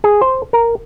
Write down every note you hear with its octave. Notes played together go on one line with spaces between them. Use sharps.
G#4
C5
A#4